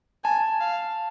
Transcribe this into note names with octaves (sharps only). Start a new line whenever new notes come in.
G#5 A5
F5